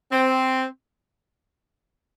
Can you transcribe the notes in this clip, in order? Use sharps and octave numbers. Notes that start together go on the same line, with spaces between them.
C4